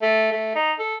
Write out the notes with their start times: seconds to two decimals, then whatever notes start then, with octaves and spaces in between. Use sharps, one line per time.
0.02 A3
0.32 A3
0.55 D#4
0.79 A4